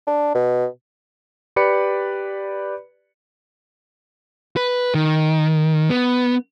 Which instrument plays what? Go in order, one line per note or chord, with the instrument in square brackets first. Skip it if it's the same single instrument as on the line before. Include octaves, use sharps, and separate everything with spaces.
[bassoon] D4
B2
[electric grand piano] G4 B4 D5 B5 C#7
[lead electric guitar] B4
D#3
B3